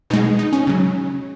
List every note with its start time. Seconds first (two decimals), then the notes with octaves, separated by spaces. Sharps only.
0.10 B2 D#4
0.13 G#3
0.39 D#4
0.53 C#4
0.67 C#3 F#3